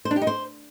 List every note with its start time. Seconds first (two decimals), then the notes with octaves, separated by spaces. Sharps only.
0.05 C5
0.11 D4
0.16 G4
0.22 D#4
0.27 C5